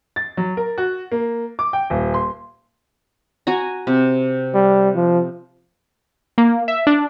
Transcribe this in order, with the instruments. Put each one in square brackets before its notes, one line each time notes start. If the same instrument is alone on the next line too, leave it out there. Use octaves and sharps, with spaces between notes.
[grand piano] A6
F#3
A#4
F#4
A#3
D6
G5
D#1
C6
[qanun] F#4 G#5 A#5
C3
[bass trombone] G3
F3
[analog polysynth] A#3
E5
D4